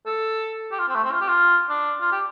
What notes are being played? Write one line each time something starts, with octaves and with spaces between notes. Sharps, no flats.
A4
G4
F4
C4
A3
C4
F4
G4
F4
D4
F4
G4